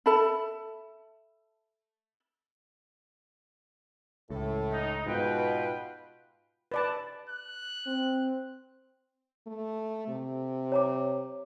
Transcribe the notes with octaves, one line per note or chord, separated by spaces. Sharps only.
A4 E5 A5 B5
C#2 A2 A4
D#4
G#2 B2 F4 B4 G5
B4 D5 A5
F#6
C4
A3
C3
C#5 A#5 D6